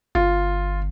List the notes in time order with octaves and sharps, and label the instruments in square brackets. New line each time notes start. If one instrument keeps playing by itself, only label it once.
[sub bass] G1 [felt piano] F4